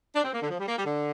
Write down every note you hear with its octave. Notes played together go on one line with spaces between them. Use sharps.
D4
C4
A#3
D3
F3
G3
A#3
G3
D3